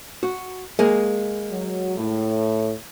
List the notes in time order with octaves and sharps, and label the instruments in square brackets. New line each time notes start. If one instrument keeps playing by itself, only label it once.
[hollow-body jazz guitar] F#4
G#3 A#3 G#4
[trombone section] F#3
A2